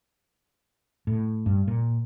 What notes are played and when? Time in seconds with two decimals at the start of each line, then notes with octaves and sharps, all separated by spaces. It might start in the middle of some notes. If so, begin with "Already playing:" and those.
1.07 A2
1.46 G2
1.68 A#2